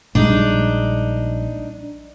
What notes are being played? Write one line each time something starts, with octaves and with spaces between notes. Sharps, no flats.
A#1 G3 G#3 D4 D#4